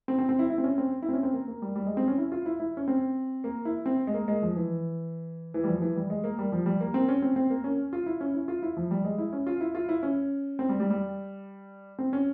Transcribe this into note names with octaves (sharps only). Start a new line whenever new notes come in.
C4
C4
C4
E4
E4
C4
C#4
C4
E4
C4
C#4
C4
A#3
A#3
G3
G3
G#3
C4
C#4
E4
F4
E4
E4
C#4
C4
A#3
E4
C4
G#3
A#3
G#3
F3
E3
E3
G3
F3
E3
G3
G#3
A#3
G3
F3
G3
A#3
C4
C#4
C4
C4
A#3
C#4
F4
E4
C#4
E4
F4
E4
F3
G3
G#3
E4
C#4
F4
E4
F4
E4
C#4
C4
G3
G3
G3
C4
C#4